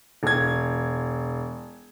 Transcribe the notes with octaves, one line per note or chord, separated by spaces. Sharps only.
E1 G#6